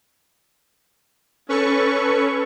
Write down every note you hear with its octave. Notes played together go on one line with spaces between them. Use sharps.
C#4 A4 B4 C#6